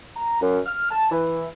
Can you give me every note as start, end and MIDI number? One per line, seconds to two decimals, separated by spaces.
0.16 0.40 82
0.41 0.59 42
0.66 0.87 89
0.91 1.10 81
1.12 1.44 52